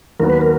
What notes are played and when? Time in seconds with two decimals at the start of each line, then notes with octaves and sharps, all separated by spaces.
0.20 D#2 D#3 F#3 B3 A#4
0.30 B4
0.41 A#4